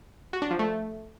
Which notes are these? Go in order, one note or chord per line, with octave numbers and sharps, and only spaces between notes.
F#4
D4
F3
A3